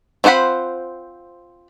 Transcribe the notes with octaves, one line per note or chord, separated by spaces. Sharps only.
C4 F4 C5 F#5 B5